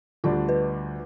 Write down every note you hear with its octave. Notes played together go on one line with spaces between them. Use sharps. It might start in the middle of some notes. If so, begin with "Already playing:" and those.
D2 D3 G3 D4 F4
B4